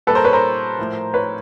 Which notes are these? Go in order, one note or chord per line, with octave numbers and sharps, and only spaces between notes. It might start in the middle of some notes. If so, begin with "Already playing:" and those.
A#2 G3 A4 B4
A#4 C5
B4 C#5
A#4 C5
A2 F3
B4 C#5